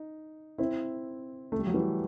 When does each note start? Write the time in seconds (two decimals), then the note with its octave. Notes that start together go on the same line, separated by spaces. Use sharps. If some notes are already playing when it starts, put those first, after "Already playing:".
Already playing: D#4
0.58 C4 E4
1.52 A3
1.59 G3
1.67 F#3
1.74 E3 G3